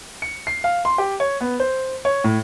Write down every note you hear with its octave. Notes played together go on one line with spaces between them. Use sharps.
C#7
C7
F5
C6
G4
C#5
B3
C5
C#5
A2